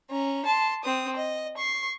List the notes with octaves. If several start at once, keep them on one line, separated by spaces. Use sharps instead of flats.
C#4 A#5
A5 C6
C4 D#6
D#5
C#6 C7